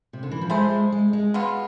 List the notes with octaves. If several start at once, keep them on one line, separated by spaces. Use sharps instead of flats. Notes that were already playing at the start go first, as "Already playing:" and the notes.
C3
D3
E3
F3
G#3 A3 E4 G#4 C5
G#3
G#3
G#3
B2 B3 F4